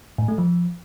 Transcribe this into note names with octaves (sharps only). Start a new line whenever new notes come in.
A2
A3
F3